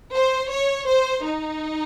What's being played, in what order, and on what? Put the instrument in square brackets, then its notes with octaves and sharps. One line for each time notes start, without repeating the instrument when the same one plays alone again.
[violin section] C5
C#5
C5
D#4